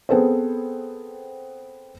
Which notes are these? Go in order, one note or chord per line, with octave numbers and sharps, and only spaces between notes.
B3 C4 G#4 A4 B4 C5